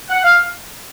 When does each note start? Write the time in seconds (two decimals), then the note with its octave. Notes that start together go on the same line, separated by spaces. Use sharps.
0.09 F#5
0.24 F5